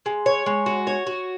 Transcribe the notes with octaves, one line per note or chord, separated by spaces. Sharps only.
G#3
C#5
G#3
F#4
C#5
F#4